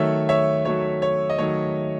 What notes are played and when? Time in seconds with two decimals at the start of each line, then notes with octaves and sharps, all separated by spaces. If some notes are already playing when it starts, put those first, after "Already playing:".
Already playing: D#3 F#3 A3 C#5 E5
0.29 C#5 E5
0.65 D#3 F#3 A3 C#5
1.02 C#5
1.30 D#5
1.38 D#3 F#3 A3 C#5